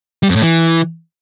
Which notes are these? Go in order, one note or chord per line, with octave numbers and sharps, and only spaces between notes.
G3
F2
A2
E3